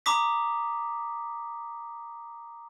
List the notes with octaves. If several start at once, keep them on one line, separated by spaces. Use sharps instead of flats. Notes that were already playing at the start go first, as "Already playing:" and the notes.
A#5 B5 D6 D#6 B6